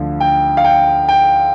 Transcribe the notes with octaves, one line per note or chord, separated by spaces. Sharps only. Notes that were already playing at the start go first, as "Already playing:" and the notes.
Already playing: D2 D3 F3
G5
F5
G5
G5